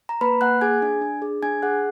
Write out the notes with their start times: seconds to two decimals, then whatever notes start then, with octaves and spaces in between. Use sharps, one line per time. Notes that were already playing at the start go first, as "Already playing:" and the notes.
0.09 A#5
0.21 A#3 B4 B5
0.41 A#3 F#5 F#6
0.61 G#4 G#5 G#6
0.82 D4
1.01 D4
1.22 G#4
1.42 D4 G#5 G#6
1.62 G#4 F#5 F#6